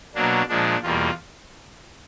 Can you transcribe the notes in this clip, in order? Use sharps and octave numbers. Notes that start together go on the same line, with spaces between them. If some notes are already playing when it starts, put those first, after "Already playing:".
B2 F#3 A#3 D4
A#2 F3 G#3 D4
E2 B2 G3 A#3 F4